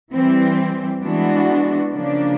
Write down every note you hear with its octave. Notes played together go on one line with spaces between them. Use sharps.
E3 G3 C4
E3 G#3 B3 D4 F#4
C#3 F3 A#3 D4